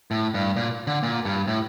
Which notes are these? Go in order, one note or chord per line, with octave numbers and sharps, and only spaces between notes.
A2
G2
A#2
D3
A#2
G2
A2